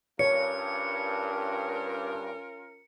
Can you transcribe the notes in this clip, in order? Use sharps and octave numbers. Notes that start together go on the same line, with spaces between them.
G2 C#4 F4 A#4 C#5 C#7